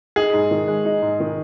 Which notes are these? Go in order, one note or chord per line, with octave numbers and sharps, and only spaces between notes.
D#4 G#4
G#2
D#3
G#3
D#4
G#2
D#3